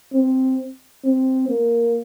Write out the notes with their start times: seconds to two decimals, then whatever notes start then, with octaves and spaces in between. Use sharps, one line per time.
0.13 C4
1.04 C4
1.49 A#3